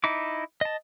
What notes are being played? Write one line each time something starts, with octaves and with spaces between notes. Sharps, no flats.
D#4 E4 D6
D#5 A5